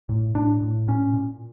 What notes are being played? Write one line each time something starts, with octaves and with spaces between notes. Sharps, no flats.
A2
A2 D4
A2
A#2 C#4
A#2